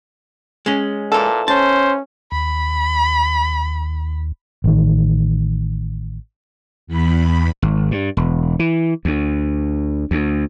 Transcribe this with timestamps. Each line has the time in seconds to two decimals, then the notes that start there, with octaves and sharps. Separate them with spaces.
0.66 G#3 C#4
1.12 A#2 E3 A4
1.48 C#4 C5 A5
2.32 D#2 B5
4.64 A1 D#3
6.87 E2 B5
7.62 G#1
7.91 G2
8.17 E1
8.59 E3
9.05 D2
10.11 D2